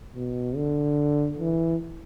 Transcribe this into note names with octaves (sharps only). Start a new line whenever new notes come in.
B2
D3
E3